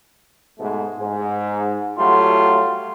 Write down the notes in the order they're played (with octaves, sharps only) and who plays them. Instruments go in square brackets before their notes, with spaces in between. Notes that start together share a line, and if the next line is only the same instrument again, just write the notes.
[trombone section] G#2 B2 A3
G#2
[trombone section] F#3 G3 A3 [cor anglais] F4